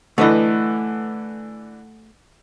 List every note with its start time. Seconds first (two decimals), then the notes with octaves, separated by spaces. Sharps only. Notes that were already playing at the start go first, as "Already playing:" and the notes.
0.18 D3 E3 A3 B4 D#5